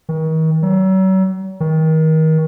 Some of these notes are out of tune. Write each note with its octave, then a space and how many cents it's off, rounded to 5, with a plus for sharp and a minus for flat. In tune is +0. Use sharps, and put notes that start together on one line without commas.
D#3 +40
F#3 +40
D#3 +30